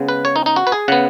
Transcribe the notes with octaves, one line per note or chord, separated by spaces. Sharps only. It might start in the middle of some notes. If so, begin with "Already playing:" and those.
Already playing: C#3 G#3 B3
B4
C#5
D#4
D#4
F#4
B4
G#4
C#3 B3 F#5